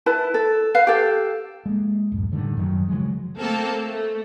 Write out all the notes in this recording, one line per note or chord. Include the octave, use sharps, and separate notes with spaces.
E4 B4 A5
A4
B4 F5
G4 A4
G#3 A#3
D1 F#2
A2 D3 D#3 G3
F#2 D#3 F#3
C#3 F3 F#3 G#3
A3 A#3 C4 A4
A3